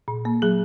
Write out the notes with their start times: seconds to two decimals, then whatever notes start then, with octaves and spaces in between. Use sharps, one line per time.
0.08 A#2
0.25 A#3
0.42 F#3 G#4